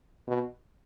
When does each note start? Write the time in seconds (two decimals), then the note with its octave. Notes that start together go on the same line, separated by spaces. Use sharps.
0.28 B2